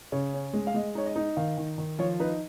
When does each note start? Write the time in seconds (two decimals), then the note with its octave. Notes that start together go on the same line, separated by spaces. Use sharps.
0.12 C#3 C#5
0.33 C#4
0.53 G#3
0.67 F5
0.74 G#3 D#5
0.95 D#4 C#5
1.06 D#5
1.16 D#4
1.37 D#3 F5
1.57 D#3
1.78 D#3
1.99 F3 C#5
2.20 D#4 B4